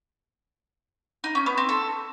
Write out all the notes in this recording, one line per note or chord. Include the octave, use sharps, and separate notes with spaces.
D#4
C#4
B3
C4
A4